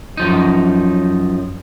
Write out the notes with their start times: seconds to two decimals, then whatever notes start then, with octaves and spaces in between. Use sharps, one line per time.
0.17 F#2 F3 D#4